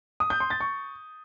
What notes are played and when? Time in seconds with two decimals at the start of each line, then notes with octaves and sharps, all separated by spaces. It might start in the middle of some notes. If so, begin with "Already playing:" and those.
0.20 D#6
0.30 G6
0.40 C6
0.50 A6
0.60 C#6